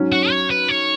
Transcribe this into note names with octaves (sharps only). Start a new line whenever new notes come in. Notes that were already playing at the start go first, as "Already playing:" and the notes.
Already playing: G#2 F#3 C#4
F#4
C#5
B4
C#5